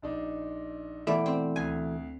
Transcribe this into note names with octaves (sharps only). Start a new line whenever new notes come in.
A#1 D4 D#4
B2 E3 A3 D5
C4
D2 G#5